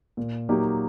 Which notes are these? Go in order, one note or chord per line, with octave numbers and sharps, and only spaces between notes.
A#2
F#3 A#3 D#4 G4